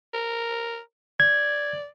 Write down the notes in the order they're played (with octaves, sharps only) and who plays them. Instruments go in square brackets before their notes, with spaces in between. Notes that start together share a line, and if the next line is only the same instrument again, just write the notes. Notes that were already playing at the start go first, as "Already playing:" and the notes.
[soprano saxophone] A#4
[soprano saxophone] D5 [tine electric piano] G#6